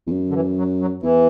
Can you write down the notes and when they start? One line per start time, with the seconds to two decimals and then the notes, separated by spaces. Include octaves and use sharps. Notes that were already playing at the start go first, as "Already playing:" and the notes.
0.07 E2
0.11 F#2
0.29 D3
0.34 E3
0.56 F#3
0.79 F#3
1.03 E2 E3